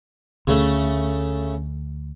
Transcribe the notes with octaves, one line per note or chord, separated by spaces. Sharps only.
D2 C#3 A3